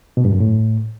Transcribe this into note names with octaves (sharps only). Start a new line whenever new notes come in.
B2
G2
F#2
A2